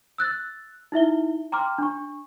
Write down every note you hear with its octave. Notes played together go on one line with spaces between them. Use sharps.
E6 F#6 A6
D#4 E4 E5 G7
G5 A#5 C6 D6 F6
D4 C#6